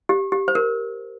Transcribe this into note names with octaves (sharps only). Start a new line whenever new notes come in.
G4
G4
C5
A#4